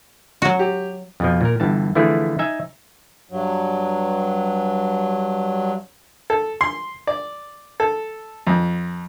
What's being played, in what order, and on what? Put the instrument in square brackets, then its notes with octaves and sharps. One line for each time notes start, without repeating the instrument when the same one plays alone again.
[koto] F#3 F#4
[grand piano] G4
[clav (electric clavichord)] F2 B2 F3
A#2 A#4
G1 G2 E3 A5
D3 E3 F3 A3 E4 G#4
D#4 E5 G#5
[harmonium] G2 F#3
[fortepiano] A4
C6
D5
A4
F2